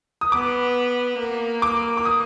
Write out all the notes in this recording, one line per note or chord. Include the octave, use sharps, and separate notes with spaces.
D#6
B3 D6
A#3
D6
D6
D#6